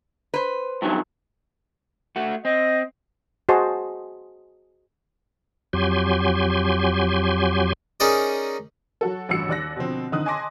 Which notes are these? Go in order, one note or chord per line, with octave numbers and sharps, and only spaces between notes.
B4 C5
G2 D#3 F#3
A3 F#4
C4 D#5
F#4 G#4 C5 D#5 A5 C6
F2 F#3 G4 G#5 C6
C#4 D#4 G#4 A#4 D5 D#5
F#3 F#4 A4
A1 G2 F#4 E6 C#7
D#2 D5 F#6 A#6
B2 D3 F3 C4
F#1 D3 D#3 D#4 D#6 F#6
D#5 G#5 A5 C6 D6 A#6